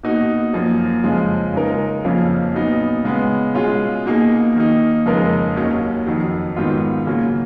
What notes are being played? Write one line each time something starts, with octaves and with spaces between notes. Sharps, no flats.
B2 A#3 D#4 F#4
F#2 F3 A#3
F2 C#3 F3 G#3
C#3 G#3 D#4 A#4
F2 C#3 F3 A#3 C#4
A#2 F#3 B3 D#4
C#3 G#3 B3
B2 G#3 C#4 F4 G#4
B2 A#3 D#4 G#4
D#3 A#3 D#4
F2 C#3 G#3 D#4 A#4
D#2 D#3 F#3 C#4
F2 D#3 F#3
G#2 D#3 F#3 B3 F4
C#3 F#3 A#3